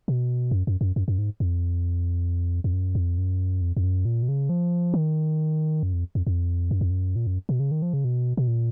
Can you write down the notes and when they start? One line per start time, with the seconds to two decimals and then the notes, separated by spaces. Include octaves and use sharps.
0.08 B2
0.51 F#2
0.67 F#2
0.81 F#2
0.96 F#2
1.08 F#2
1.18 G#2
1.40 F2
2.64 F2
2.73 F#2
2.95 F2
3.18 F#2
3.61 F2
3.77 F2
3.84 F#2
4.05 A#2
4.23 B2
4.29 C#3
4.49 F3
4.94 D#3
5.83 F#2
5.93 F2
6.15 F2
6.27 F2
6.71 F#2
6.81 F2
6.90 F#2
7.16 A#2
7.27 F#2
7.49 B2
7.60 C#3
7.71 D#3
7.82 F3
7.93 C#3
8.05 B2
8.37 B2
8.48 A#2